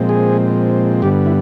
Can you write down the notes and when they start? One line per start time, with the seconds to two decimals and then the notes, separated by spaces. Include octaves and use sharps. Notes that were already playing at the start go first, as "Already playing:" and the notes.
Already playing: A#2 F3 G#3 C4
0.09 G#4
1.02 G2 D3 G3 B3 G4
1.26 E4